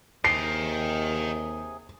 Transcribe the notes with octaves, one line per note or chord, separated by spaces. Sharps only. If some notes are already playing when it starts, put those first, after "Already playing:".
D#2 C3 G#4 D#5 G5 G#5 C7